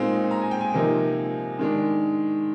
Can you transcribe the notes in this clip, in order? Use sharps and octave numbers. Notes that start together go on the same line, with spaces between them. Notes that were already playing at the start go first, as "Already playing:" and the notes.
Already playing: A#2 G#3 C4 D#4 F5
A#5
G#5
G5
G#5
C3 F3 A#3 D#4
D#3 G#3 D4